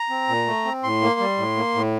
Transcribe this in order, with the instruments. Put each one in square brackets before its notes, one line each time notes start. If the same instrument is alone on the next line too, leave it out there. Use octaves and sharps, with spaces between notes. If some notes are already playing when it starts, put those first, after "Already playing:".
Already playing: [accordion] A#5
C4
A#2
A3
C4
A2 C6
A#3
G3
A2
A#3
A2